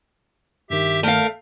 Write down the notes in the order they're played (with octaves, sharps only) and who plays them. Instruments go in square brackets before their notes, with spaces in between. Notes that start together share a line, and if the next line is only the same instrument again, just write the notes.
[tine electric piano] G2 D#3 [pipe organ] G4 E5
[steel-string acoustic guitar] A3 F5 [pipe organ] A#4